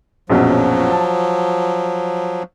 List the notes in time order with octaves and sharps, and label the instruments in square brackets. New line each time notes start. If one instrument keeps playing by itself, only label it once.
[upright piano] A#1 F#2 B2 [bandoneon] F3 F#3
[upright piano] A5